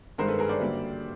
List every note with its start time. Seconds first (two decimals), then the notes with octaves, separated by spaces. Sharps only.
0.18 G2 D#3 G#3 A#4 C5
0.28 A4 B4
0.39 G#4 A#4
0.49 C5 D5
0.59 F#2 D3 G3 A#3